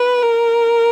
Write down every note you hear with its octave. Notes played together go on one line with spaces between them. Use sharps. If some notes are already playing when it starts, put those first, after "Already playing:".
Already playing: B4
A#4